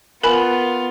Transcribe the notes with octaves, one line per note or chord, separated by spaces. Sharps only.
B3 F4 A#4 G#5 B5